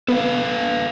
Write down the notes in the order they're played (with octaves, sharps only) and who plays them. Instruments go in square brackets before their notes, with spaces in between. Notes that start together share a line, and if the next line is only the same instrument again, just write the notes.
[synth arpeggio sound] B3 [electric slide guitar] A4 B4 F5